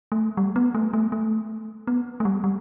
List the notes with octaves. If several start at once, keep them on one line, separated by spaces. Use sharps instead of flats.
A3
G3
B3
A3
A3
A3
B3
A3
G3
G3